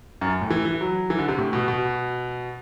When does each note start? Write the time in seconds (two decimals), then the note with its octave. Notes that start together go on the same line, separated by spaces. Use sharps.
0.21 F#2
0.41 A2
0.50 E3
0.65 E3
0.81 F#3
1.10 E3
1.19 D3
1.28 C3
1.38 A2
1.53 B2
1.68 B2